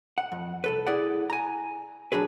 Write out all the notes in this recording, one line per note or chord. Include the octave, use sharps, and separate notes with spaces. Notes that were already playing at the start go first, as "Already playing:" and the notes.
F#5
F2
C2 A4 B4
E4 G#4 D5 F#5
G#5 A#5
F#3 D4 F#4 G#4 B4